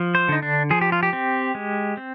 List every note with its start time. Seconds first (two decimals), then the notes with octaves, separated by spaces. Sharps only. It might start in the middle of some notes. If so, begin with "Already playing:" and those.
Already playing: F3
0.15 C5
0.29 D3 D#4
0.42 D4
0.70 F3 G#4
0.81 G4
0.92 F4
1.03 G4
1.13 C4
1.55 G#3
1.97 C4